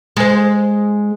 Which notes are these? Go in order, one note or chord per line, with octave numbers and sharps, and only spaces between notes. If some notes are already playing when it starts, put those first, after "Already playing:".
G#3 C5